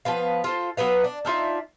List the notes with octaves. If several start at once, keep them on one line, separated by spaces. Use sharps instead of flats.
F3 B3 B4 F5
F4 A4 C5
F#3 B3 B4 F5
D4
D4 D#4 F4 E5